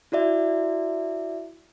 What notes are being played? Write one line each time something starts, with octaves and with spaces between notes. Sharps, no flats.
E4 F#4 D5 E5